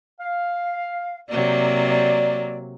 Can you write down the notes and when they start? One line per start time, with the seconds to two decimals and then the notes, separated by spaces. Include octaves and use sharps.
0.20 F5
1.29 C3 F#3 A#3 D5